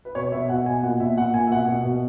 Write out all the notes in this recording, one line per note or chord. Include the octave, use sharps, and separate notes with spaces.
B4
B2 C#5
B2 E5
B2 F#5
B2 G#5
A#2 F#5
A#2 E5
A#2 F#5
A#2 G#5
E5
B2 F#5
B2
B2